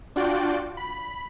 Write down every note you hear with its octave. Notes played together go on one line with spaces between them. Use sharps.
D4 F4 F#4 D5 G5
B5